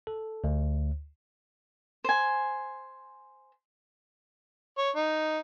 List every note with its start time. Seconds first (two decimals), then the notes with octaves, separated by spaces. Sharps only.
0.07 A4
0.44 D2
2.04 C5 G#5
4.78 C#5
4.95 D#4